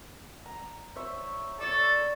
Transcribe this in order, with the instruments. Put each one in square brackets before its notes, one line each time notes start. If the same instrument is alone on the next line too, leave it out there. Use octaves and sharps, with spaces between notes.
[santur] A#5
C5 C#5 E5
[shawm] A4 [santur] C#5 D5